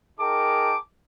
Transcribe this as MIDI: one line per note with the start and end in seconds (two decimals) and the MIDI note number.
0.20 0.76 63
0.20 0.76 68
0.20 0.76 70
0.20 0.76 79
0.20 0.76 81
0.20 0.76 86